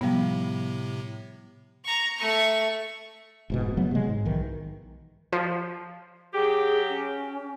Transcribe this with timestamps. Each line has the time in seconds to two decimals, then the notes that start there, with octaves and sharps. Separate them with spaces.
0.01 A2 C3 F3 G3 B3
1.84 A#5 C#6
2.17 A3 C#6
3.50 F1 G#2 B2
3.77 C#3 F#3 A3 B3
3.91 C3 F#3 G#3
4.09 G#2
4.25 B1 D#3 E3
5.32 F3
6.33 F#3 G4 G#4
6.89 C#4